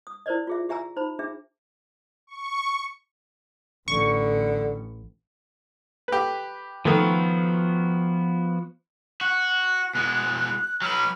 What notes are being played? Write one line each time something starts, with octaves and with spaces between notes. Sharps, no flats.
D#6
E4 A#4 C5 D5 D#5
F4 G#4 E5
G4 E5 G#5 A#5 E6
D#4 C5 B5
D4 G#4 E5
C#6
A1 D3 C#6
G4 B4
D#3 F3 A3 B3 F#4
F#4 F#6
B2 G#3
F#3 B4 F6